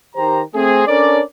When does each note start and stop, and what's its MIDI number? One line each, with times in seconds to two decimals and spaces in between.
0.16 0.42 51
0.16 0.42 67
0.16 0.42 72
0.16 0.42 82
0.54 0.86 57
0.54 0.86 60
0.54 0.86 68
0.86 1.21 61
0.86 1.21 62
0.86 1.21 69
0.86 1.21 70
0.86 1.21 73
0.86 1.21 74